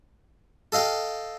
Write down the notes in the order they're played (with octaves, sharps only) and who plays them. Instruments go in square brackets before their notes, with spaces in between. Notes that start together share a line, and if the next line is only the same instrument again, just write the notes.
[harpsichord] A4 D#5 F5 G5